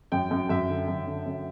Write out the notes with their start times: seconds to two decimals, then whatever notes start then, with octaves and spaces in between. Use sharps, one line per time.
0.12 F#2 G5
0.31 F#2
0.49 F#2 E5
0.69 D3
0.88 F#2
1.07 D3
1.26 F#2